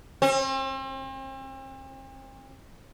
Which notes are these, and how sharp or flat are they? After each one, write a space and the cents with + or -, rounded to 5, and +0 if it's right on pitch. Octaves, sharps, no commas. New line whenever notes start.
C4 +40